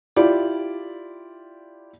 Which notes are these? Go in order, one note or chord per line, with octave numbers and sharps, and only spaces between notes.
E4 F4 G4 D5